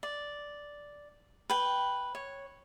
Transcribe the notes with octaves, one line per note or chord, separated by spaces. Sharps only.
D5
B4 G5
C#5